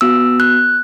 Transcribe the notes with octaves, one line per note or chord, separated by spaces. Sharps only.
B3 F#4 E6
F#6